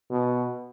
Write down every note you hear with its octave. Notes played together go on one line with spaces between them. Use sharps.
B2